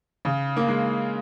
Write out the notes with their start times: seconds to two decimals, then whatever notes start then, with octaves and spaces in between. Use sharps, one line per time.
0.25 C#3
0.56 A#3
0.68 G#3